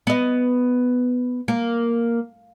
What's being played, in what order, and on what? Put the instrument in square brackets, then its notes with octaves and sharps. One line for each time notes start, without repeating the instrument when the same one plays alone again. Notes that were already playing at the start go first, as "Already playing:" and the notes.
[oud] B3 D#5
A#3